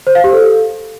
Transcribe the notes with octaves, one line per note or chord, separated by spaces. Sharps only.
C5
F5
G4
A4